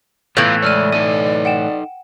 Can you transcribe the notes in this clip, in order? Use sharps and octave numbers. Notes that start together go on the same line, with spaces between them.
A2 E3 B3 F4 F5 F#6 G6 D7
G#3 C#5 D5 E6 F6 D#7
D#4 A4 D#5 D#7
F#5 G5 E7